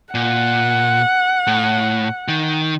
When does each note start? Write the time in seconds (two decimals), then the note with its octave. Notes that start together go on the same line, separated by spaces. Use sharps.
0.15 A#2 F#5
1.47 A2
2.28 D#3